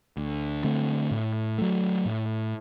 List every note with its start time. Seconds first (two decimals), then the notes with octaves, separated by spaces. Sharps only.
0.17 D2
0.64 D3 A3 C4
1.11 A2
1.58 F#3 A3
2.05 A2